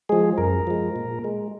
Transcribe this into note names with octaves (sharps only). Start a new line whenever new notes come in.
F3 G#3 G#4
F#2 A#4
F3 G#3
A#2
G#3